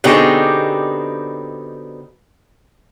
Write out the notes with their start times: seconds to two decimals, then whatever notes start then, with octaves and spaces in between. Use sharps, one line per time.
0.04 B2 D3 C4 D#4 G4 G#4